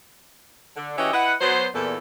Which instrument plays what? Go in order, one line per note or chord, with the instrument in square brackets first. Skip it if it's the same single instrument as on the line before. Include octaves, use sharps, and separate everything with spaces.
[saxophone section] D3
E3 C#4 F#4 G4 D#5 E5
E4 B4 D#5 F#5
F#3 B3 C5
E2 A#2 A4